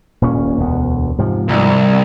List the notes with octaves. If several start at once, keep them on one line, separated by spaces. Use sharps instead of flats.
D#1 A#2 C#4
E1 D2 B3
G#2 C3 F3
C2